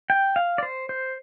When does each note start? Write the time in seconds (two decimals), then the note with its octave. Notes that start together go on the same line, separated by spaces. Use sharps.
0.10 G5
0.36 F5
0.58 D5
0.63 C5
0.89 C5